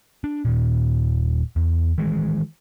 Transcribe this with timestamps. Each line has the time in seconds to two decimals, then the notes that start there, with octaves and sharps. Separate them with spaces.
0.24 D4
0.45 D#1 A#2
1.56 E2
1.98 D#3 E3 G#3